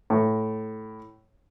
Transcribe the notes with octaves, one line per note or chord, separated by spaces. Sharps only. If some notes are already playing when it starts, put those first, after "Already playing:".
A2